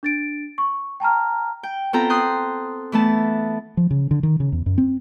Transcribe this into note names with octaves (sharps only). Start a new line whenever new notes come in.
D4 A6 D7
C#6
G5 A5 A#5 F6
G5
B3 C4 F4 A4 G5 A#5
C6 D#6 F#6 G6
E3 A3 B3 A5
F3
C#3
D3
D#3
C#3
E2
F#2
C4